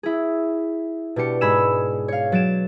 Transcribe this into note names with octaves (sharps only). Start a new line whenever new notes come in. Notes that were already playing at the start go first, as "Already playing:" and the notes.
E4 G#4
B2 D4 G4 C#7
G#2 G#4 G#5 B5 E6 E7
C#5 F5
F#3 A6 D7 E7